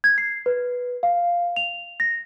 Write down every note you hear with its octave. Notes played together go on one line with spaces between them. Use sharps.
G#6
C7
B4
F5
F7
A#6